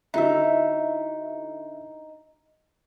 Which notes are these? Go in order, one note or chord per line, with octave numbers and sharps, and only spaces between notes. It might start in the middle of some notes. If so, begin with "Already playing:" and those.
D3 D#4 E4 F#4 E5